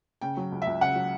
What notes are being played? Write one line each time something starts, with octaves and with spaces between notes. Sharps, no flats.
C#3 G5
F#3
C#2
E5
C#2
C#3 F#5
F#3